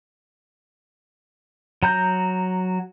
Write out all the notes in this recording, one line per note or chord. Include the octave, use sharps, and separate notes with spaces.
F#3 A#5 G6